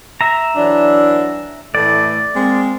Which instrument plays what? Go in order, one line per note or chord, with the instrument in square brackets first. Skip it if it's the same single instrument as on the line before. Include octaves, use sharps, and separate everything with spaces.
[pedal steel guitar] E5 A#5
[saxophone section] E3 F#3 D4
[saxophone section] A2 E3 A3 [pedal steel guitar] D5
[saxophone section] G#3 A#3 C4